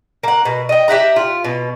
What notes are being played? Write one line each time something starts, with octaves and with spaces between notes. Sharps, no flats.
A#3 F#5
B2
D#5 G5
G4 E5 F#5 A#5
F4
B2